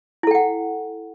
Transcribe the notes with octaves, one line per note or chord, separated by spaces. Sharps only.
E4 A4 F#5 G5